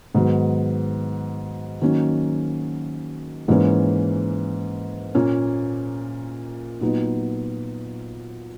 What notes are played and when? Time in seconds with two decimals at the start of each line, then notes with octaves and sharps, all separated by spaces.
0.15 G#2 D#3 F#3 B3
1.81 D#3 F#3 A#3 C#4
3.48 G#2 E3 A#3 C#4
5.15 A#2 A#3 C#4
6.81 A#2 F#3 B3 D#4